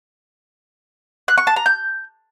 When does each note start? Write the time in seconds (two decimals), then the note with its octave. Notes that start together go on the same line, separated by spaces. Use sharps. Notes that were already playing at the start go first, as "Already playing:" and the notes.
1.28 F#6
1.38 C#6
1.47 A5
1.56 A#5
1.66 G6